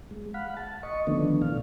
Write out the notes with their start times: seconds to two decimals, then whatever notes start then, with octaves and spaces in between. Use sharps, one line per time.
0.11 G#3
0.34 F5 F#5 B5
0.57 A5
0.83 D#5 C#6
1.07 D3 D#3 F3 A3 B3 D4
1.42 B2 E3 F5